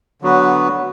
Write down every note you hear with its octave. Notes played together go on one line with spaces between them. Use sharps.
D3 F#3 B3 F#4 B4